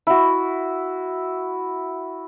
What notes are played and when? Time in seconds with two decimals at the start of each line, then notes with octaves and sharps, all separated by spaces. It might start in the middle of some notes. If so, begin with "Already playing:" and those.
0.07 E4 F#4